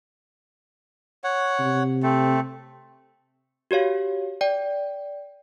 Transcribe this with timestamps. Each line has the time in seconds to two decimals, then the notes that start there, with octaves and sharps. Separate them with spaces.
1.24 C#5 F#5
1.59 C3
2.03 A3 C4
3.71 F#4 G4 C#5 F5
4.41 D5 G5